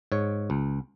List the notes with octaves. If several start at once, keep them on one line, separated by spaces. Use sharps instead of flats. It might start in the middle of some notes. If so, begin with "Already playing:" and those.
G#2 C#5
C#2